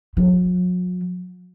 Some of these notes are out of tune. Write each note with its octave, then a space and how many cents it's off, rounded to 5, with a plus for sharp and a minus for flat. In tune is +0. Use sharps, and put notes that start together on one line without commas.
F#3 -40